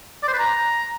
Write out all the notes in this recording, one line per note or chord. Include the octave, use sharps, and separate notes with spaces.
D5
C5
B4
A#5